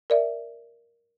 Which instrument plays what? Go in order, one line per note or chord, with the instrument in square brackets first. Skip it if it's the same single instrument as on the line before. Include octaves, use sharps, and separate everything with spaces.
[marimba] A#4 D5 E5